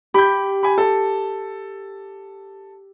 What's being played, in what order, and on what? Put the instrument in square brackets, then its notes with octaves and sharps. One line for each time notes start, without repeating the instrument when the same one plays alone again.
[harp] G4 [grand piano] B5 G6
[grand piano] G#5 B5
A4